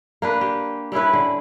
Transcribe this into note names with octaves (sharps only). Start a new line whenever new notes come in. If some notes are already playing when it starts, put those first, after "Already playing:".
A#3 D4 B4
G4
G3 C#4 E4 B4
D3